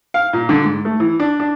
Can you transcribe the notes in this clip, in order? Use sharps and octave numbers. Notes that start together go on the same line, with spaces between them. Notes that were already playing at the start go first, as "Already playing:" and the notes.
F5
A#2
D3
G#2
A3
E3
D4
D4